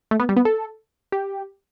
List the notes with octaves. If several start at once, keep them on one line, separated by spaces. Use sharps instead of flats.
A3
B3
G3
B3
A4
G4